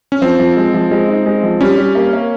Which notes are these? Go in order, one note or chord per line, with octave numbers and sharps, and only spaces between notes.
C#4
F3 C4
F3
G#3
F3
G#3
D#4
G#3
F3
G3 C#4
G3
A#3
A#3